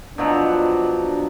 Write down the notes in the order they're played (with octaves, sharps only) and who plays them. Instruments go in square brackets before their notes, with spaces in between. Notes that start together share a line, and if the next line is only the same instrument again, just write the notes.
[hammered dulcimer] B2 F3 F#3 [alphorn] D4